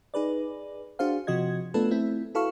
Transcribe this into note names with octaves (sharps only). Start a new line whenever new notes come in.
D#4 G#4 B4 D5
D4 F#4 G#4 C5 F5
C3 F3 F#4 D#5 G#6
A3 B3 D4 F4 A4 B4
A3 C4 E4
E4 F#4 A4 B4 F5 C#6